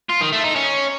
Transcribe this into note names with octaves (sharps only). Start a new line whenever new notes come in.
F4
D#3
A3
D#4
C#4